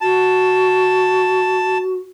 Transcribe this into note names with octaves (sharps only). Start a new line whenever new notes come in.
F#4 A5